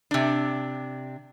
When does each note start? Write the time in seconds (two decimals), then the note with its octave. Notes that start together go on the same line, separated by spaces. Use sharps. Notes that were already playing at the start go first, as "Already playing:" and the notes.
0.11 C3 D4